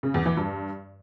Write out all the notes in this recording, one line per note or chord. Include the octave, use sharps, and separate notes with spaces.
C#3
E2
E3
G2